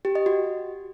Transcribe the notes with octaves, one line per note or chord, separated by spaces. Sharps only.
G4
D#5
F#4